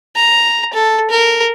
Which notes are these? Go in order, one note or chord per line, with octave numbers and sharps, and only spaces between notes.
A#5
A4
A#4